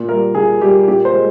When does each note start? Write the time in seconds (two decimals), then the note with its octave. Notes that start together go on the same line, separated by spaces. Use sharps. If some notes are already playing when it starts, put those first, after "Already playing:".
Already playing: A#2
0.08 G3 A#3 A#4
0.35 A#2 G#4
0.61 G3 A#3 G4
0.88 A#2 G4
1.05 C5
1.14 G#3